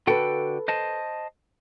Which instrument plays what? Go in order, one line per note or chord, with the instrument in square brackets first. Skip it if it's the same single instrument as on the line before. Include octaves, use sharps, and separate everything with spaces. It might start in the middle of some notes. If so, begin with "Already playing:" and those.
[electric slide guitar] D3 F#4 G5 [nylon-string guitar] A4 B4
[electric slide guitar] C5 D#5 A5